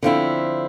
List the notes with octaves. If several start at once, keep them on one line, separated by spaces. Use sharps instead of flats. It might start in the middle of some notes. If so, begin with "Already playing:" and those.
D3 F3 C4 E4